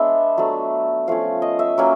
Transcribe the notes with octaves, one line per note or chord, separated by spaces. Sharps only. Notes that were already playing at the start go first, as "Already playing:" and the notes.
Already playing: G#3 B3 D4 E5
F#3 A3 D4
F3 A3 C#4 F5
D#5
E5
F#3 A#3 C#4